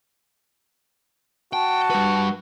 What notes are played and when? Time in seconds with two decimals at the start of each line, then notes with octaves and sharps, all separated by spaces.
1.53 F#4 G5 A5
1.91 G3 B4